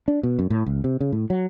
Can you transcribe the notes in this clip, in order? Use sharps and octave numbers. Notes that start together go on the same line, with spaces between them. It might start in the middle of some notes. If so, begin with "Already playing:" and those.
D4
B2
F#2
A2
C#2
C3
C#3
A2
F#3